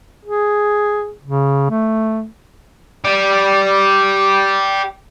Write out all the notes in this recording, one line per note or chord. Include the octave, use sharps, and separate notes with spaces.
G#4
C#3
A3
G4 D5